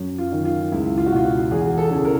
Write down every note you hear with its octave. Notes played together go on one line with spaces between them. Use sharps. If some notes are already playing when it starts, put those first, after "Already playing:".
Already playing: F#2
F4
D#3
F4
C#2 E4
F4
F#4
B2 F4
F#4
E2 G#4
A4
C#3 E3
A#4